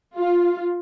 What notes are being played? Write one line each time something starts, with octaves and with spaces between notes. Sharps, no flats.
F4